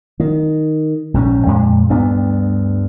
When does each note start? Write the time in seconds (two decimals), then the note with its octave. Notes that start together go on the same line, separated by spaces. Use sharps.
0.20 D#3
1.14 A#1 G#2 C#3 C#4
1.47 F2 A#2 G#3
1.89 D2 G2 B3 D4